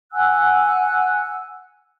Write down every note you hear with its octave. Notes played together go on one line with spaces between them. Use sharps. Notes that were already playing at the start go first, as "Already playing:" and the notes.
F#5 G#5 E6 F#6